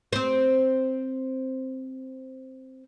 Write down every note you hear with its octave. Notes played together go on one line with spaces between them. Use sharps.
C4 C5